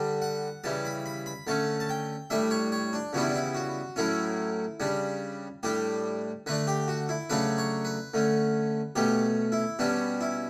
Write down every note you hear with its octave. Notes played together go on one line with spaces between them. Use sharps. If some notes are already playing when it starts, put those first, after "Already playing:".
Already playing: D3 G3 D4
F#5
C#3 E3 G3 A5
B5
B5
B5
D3 A3 C#4 A5
A5
G5
A2 G3 D4 E5
C#5
C#5
D4
C#3 E3 G3 B3 D4 F#4
E4
D4
E4
F#4
A2 F#3 A3 C#4 E4
C#3 G3 D4
A2 G3 D4 G4
D3 A3 D4 B4
G4
F#4
E4
C#3 F#3 A3 D4 B4
C#5
B4
D3 A3 C#4
B2 A3 C#4 G4
E4
B2 G3 C#4 D4
E4